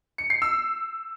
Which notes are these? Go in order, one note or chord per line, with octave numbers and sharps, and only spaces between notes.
C#7
C7
E6